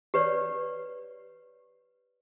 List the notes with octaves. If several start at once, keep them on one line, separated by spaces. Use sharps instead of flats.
G4 B4 C#5 D5